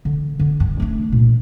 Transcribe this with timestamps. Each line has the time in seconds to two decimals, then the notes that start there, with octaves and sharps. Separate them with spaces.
0.05 D3
0.39 D3
0.60 G2
0.80 A3 D4
1.12 A#2